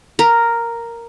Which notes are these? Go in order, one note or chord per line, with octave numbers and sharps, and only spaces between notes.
A#4